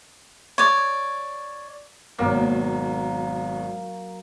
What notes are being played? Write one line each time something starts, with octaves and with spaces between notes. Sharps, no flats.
C#5 D5
G#1 B2 F#3 A#3